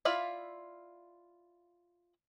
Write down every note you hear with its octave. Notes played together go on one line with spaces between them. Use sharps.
E4 F4 D5 E5 F5